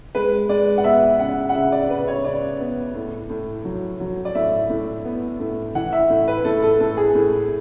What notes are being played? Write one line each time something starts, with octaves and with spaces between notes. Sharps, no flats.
G#3 B4
G#3 D5
F#5
B3 E5
C#3 F#5
F#5
C#3 E5
D5
C#3 B4
C#5
C#3 D5
B3
A2
A2
F#3
F#3
D5
A2 E5
A2
B3
A2
E3 F#5
E5
A2
B4
A2 A4
A4
A2 A4
G#4
A2